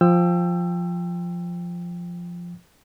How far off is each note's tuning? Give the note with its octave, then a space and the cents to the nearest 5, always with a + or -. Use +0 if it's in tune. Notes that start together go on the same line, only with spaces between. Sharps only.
F3 +0 G5 +10 E6 +25